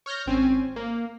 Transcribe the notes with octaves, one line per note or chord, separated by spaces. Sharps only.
C#5 F6 G6 A#6
G#1 C4 C#4 G#5
A#3